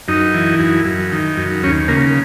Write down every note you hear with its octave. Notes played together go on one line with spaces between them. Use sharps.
F#2 D#4
E3
F#2
F#2
D#3
F#2
D#2 C#4
C#3 A#3